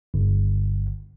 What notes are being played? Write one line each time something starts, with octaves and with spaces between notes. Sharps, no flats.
G1